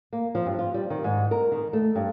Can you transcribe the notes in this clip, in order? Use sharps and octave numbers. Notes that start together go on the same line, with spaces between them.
A#3
F3
G2
F4
G3
D#3
G#2
A#4
D#3
A3
G2